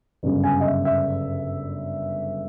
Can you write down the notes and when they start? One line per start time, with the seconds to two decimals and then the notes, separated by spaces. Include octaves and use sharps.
0.23 G1 F#2 C#3
0.44 G#5
0.61 D#5
0.65 E5
0.85 E5